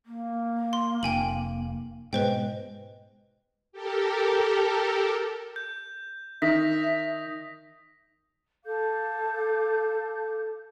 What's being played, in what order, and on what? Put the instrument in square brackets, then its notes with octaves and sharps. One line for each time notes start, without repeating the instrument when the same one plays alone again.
[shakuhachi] A#3
[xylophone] C6
[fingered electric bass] F1 [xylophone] G5 G#5 F#7
[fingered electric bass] G#2 B2 G#3 [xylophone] B4 C5 G5 [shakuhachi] D#5
[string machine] G4 A4 A#4
[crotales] G6
[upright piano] D#3 [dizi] E5 [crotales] D#6 A#6 B6
[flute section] A4 F5 D6 G6